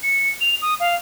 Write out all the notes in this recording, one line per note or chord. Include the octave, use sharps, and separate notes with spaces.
C#7
F7
D#6
F5